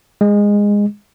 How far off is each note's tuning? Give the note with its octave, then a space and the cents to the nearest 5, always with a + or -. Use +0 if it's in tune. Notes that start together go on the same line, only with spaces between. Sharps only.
G#3 -15